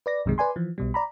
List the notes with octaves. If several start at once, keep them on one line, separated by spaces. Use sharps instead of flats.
B4 D5 A#6
B1 F#2 C3 D#3 G#3
B4 D5 G#5 C6
E3 F3
B1 B2 G3
D5 A#5 B5